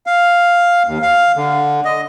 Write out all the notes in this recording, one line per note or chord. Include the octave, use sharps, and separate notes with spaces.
F5
D#2
F5
D3
D#5